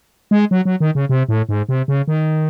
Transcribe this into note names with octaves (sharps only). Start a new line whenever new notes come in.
G#3
F#3
F#3
D#3
C#3
C3
A2
G#2
C3
C#3
D#3